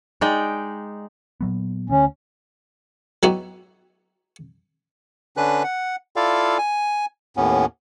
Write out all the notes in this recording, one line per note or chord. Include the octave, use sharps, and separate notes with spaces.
G#3 D#4 D5 G5
A#2 F#3 B3
D2 D3 C#4
F#3 B3 D#4 E4 F#4 G4
D3 C#4 D4 B4 F#6
F#5
E4 F4 A4 D5 F5
G#5
D#2 A2 B3 C#4